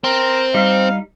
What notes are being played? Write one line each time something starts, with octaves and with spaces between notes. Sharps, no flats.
C4 A#4
G3 D#4 F5